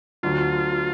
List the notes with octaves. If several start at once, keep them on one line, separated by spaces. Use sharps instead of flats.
D2 D3 F#3 F4